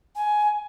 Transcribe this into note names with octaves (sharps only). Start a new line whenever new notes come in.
G#5